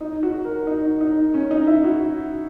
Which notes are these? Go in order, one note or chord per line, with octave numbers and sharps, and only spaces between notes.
D#4
F#4
A#4
D#4
D#4
C#4
D#4
E4
F#4